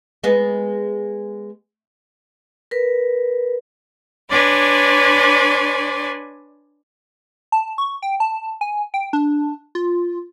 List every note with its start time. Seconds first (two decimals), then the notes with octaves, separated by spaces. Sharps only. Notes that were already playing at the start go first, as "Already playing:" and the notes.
0.24 G#3 B3
2.71 A#4 B4
4.30 D4 B4 C#5 D5 G#5 C6
7.52 A5
7.78 C#6
8.02 G5
8.20 A5
8.61 G#5
8.94 G5
9.13 D4
9.75 F4